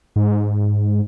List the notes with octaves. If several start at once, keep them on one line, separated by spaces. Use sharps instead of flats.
G#2